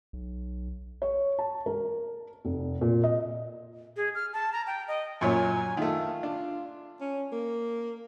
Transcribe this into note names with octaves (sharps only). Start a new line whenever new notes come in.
B1
C#5
A5
A#4
F1
A#2
D#5
G#4
F6
A5
A#5
G5
D#5
F#2 A#2 C#5 G#5
D#3 A3 F4
D4
C#4
A#3